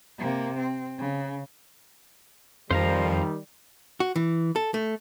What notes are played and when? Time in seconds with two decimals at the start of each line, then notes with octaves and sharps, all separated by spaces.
0.18 C3 A#3
0.58 C4
0.98 C#3
2.71 F2 D#3 F3 G3 C5 F5 A#5
4.00 F#4
4.16 E3
4.56 A4
4.74 A3